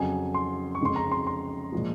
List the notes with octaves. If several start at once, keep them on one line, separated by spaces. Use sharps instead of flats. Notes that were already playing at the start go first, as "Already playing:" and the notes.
Already playing: F2 C#3 F#3 G#5
C6
C#6
F2 C#3 G#3 C6
A#5
C6
C6
A#2 F3 G#3